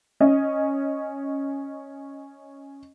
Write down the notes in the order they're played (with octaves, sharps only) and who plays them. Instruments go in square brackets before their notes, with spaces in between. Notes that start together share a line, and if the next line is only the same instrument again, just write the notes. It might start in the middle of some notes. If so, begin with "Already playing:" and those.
[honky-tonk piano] C#4 D#5